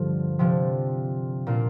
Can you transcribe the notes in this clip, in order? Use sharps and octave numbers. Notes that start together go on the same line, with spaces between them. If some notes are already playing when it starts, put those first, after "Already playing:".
Already playing: G2 D3 F3
C3 F3 D4
A#2 A#3 D4 F4